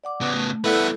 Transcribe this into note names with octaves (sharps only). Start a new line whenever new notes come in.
D5 F#5 D6
C#3 B3
A3
A3 B3 E4 A4 B4 D5 E5 F#5